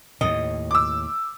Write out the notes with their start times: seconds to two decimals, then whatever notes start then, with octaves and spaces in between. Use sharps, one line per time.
0.21 D#2 A2 D#5
0.71 D6 E6